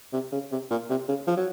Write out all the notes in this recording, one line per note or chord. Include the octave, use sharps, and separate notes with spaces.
C3
C#3
C3
A#2
C3
C#3
F3
F#3